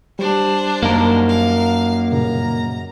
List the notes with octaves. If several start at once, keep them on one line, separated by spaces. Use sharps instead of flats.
G3 D4 G4 C5
F#2 A#3 D#4 A#4
F5
G2 A#2 C#3 A#5